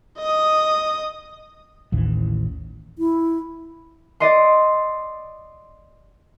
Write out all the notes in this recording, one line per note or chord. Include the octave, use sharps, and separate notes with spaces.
D#5 D#6
A1 D#2 E3
E4
D5 D#5 C6